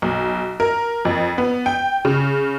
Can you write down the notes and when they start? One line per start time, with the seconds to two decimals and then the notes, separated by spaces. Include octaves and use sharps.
0.02 B1
0.60 A#4
1.05 F2
1.38 B3
1.66 G5
2.05 C#3